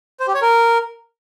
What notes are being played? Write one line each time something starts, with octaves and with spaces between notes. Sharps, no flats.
C5
G4
C#5
A#4